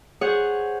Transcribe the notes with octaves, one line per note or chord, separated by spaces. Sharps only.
G#4 C5 C#5 F#5